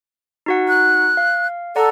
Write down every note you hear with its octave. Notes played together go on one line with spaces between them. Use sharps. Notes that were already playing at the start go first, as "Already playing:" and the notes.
D#4 F#4 F#5
F#6
F5
A4 D5 F#5 A#5